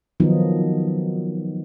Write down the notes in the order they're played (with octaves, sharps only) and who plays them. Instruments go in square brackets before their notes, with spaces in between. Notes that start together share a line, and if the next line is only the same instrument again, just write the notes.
[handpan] D#3 F3 F#3 B3 D#4